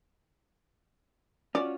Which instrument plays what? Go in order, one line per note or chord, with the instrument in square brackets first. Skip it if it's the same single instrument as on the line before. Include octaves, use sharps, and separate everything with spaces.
[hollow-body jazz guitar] C#4 F4 F#4 [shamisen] D5